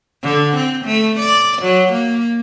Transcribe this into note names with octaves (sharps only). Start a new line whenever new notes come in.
D3
C4
A3
D5
F#3
A#3